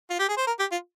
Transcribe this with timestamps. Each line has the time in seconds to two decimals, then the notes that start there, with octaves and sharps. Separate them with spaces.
0.10 F4
0.19 G4
0.29 G#4
0.37 C5
0.47 A#4
0.59 G4
0.72 F4